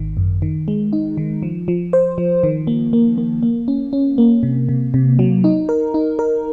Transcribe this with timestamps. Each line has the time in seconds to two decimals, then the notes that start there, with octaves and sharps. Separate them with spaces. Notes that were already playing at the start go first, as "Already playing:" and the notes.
Already playing: G#1 D#3
0.17 F#2
0.42 D#3
0.68 G#3
0.93 D#4
1.17 D#3
1.43 F3
1.68 F3
1.93 C5
2.18 F3
2.43 D#3
2.67 A#3
2.93 A#3
3.18 A#3
3.43 A#3
3.68 C#4
3.93 C#4
4.18 A#3
4.43 C3
4.69 C3
4.94 C3
5.19 F#3
5.44 D#4
5.69 A#4
5.94 D#4
6.19 A#4